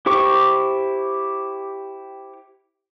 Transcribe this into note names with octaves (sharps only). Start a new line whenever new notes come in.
E4 G4 C5 C#6 D6